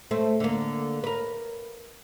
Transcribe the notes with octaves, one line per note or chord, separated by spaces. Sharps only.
A3 C4
D3 A#3
A#4 B4